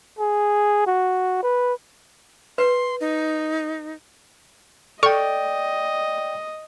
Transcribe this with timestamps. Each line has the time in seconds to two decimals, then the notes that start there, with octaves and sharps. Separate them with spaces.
0.19 G#4
0.86 F#4
1.42 B4
2.58 B4 C6
3.00 D#4
5.03 A4 D5 D#5 G5 C#6